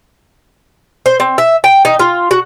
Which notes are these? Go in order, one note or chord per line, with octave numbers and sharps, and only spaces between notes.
C5
C4
E5
G5
D#4
F4
F#4